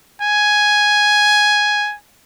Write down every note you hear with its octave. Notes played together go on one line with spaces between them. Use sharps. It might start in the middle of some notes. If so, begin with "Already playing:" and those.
G#5